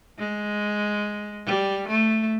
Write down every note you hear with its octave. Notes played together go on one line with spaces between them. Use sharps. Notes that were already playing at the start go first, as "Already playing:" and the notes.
G#3
G3
A3